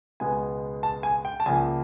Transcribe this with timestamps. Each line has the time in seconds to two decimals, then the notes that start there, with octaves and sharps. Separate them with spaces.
0.20 C#2 B2 G#3 B3 G#5
0.83 A5
1.03 G#5
1.25 G5
1.40 A5
1.46 C#2 C#3 F3 A#3 G#5